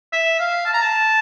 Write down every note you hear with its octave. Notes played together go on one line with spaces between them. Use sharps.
E5
F5
A5
A#5
A5